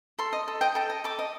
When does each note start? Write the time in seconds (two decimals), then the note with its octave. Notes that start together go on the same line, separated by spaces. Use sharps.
0.19 A4 C6
0.33 D#5
0.48 A4
0.61 D#5 G5
0.75 A4 G5
0.90 D#5
1.04 A4 D6
1.19 D#5